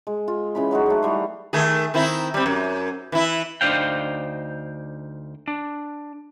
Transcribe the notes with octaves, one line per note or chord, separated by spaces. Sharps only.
G#3
F4
C#3 E3 B5
F#3 G#3 D#4 F#4
F#3 A3
E3 G3 C6
D#3 A3 G#4
D#3 C4 E4
G3 C4
F#2
E3 E4
D2 D4 D#4 C5 F5 G5
D4